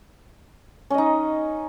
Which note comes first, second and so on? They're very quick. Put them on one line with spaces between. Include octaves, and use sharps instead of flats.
C#4 D#5 D#4